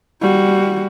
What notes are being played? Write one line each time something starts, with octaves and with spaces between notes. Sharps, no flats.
G3 F#4